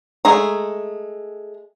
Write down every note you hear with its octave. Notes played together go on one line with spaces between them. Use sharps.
G#3 A3 G#4 A#5